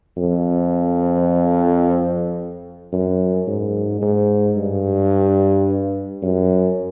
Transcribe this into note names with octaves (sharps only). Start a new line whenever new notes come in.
F2
F#2
G#2
G#2
G2
F#2